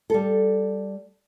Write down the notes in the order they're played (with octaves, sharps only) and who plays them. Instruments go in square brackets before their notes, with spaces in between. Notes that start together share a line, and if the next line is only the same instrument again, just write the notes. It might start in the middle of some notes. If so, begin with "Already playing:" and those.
[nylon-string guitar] G3 A4